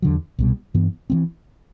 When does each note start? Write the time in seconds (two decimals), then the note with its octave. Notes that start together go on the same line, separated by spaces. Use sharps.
0.02 E2 D3 F#3
0.39 C2 B2 G3
0.74 G2 E3 B3
1.10 E3 G3 C4